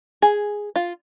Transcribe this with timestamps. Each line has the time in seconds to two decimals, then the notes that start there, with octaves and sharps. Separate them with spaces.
0.22 G#4
0.76 F4